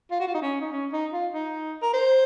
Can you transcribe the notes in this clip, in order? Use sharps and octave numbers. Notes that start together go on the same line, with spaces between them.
F4
F#4
F4
D#4
C#4
D#4
C#4
D#4
F4
D#4
A#4
C5